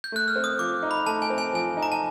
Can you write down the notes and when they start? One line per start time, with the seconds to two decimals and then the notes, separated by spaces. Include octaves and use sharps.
0.04 G6
0.12 A3 F#6
0.28 F6
0.36 C4
0.44 D#6
0.59 F3 D6
0.83 D#4
0.91 B5
1.06 A3 A5
1.22 G#5
1.30 C4
1.38 G#5
1.53 F3 G#5
1.77 D#4
1.83 A#5
1.92 A5